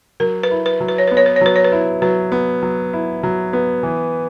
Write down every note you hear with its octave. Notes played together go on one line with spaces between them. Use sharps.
F#3 A#4
B4
E4
B4
F#3
B4
C#5
B3 B4
C#5
B4
C#5
F#3 B4
C#5
B4
E4
F#3 B4
B3
F#3
E4
F#3
B3
E3